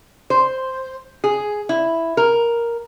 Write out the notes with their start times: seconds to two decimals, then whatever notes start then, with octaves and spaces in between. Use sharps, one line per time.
0.30 C5
1.24 G#4
1.69 E4
2.17 A#4